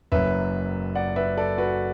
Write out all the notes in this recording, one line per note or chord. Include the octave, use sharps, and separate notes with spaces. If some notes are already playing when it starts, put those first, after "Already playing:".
F#1 F#2 F#3 B4 E5
D5 F#5
B4 E5
A4 D5
F#4 B4